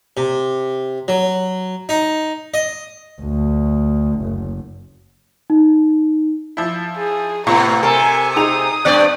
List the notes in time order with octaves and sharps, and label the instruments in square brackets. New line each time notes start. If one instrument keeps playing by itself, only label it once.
[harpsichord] C3
F#3
D#4
D#5
[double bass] D2
F#1
[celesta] D#4
[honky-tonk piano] F3 E4
[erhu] G#4
[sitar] A2 C3 B3 [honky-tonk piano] F4 C#6 [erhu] A#5
[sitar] C3 A4 [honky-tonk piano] A#4 [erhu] G#5
[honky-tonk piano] D#4 G#4 F7 [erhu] D#6
[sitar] G2 B3 D5 [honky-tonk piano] F#6 G6